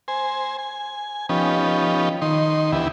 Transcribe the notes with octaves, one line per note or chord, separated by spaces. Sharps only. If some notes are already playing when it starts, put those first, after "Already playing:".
C5 G#5
G#5
F3 B3 C#4 D#4 G4
D#3 D#4 C6
D2 E3 B3 E4 G4